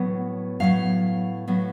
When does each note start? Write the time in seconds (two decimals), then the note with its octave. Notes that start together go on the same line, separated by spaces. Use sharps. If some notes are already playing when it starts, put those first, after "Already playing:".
Already playing: A2 F#3 B3
0.60 A2 F#3 B3 F5
1.48 A2 F#3 B3